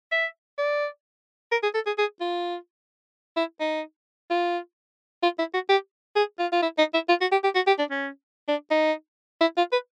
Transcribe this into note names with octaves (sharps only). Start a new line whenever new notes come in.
E5
D5
A#4
G#4
A4
G#4
G#4
F4
E4
D#4
F4
F4
E4
F#4
G4
G#4
F4
F4
E4
D#4
E4
F4
F#4
G4
G4
F#4
G4
D4
C#4
D4
D#4
E4
F4
B4